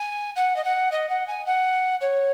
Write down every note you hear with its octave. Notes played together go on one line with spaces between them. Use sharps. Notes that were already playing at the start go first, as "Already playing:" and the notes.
Already playing: G#5
F#5
D#5
F#5
D#5
F#5
G#5
F#5
C#5